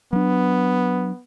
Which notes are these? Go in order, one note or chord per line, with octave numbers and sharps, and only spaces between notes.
F#3 B3 D4